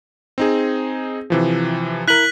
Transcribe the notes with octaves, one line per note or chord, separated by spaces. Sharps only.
C4 D#4 G#4
C3 E3 F3
E4 A#4 F#6 B6 F#7